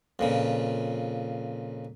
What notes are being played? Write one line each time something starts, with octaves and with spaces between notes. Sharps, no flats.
F2 A#2 C#3